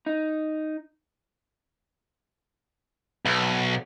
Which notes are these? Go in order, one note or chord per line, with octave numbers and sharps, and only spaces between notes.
D#4
B1